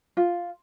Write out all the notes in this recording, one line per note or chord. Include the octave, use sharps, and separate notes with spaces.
F4